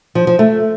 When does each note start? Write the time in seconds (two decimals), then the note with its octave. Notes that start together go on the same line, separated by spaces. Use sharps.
0.15 F3
0.27 F3
0.39 A3